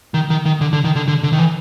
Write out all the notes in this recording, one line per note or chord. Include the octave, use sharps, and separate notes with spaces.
D#3
D#3
D#3
D3
D3
D#3
D3
D3
D3
D#3
E3